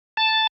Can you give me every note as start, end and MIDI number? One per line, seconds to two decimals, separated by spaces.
0.17 0.47 81